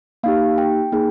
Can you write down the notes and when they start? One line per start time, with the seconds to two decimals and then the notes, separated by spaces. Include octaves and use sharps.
0.23 A#3 D#4 G4 F5
0.58 G5
0.92 A#3 D#4 G#4